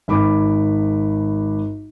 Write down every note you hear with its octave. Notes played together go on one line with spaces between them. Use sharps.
G#1 B5 D6